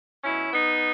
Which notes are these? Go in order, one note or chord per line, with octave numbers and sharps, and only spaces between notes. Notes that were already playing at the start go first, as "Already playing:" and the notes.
B2 F#3 C#4 E4
B3 D#4